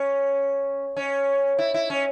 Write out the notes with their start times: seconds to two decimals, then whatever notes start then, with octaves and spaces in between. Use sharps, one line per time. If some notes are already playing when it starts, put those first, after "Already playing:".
Already playing: C#4
0.96 C#4
1.59 E4
1.74 E4
1.90 C#4